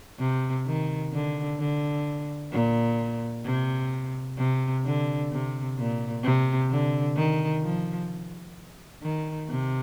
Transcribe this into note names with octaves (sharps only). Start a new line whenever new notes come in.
C3
D#3
D3
D3
A#2
C3
C3
D3
C3
A#2
C3
D3
D#3
F3
D#3
C3